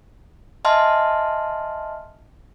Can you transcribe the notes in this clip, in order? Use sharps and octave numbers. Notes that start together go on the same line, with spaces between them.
D#5 E5 G#5 A5 C6 F6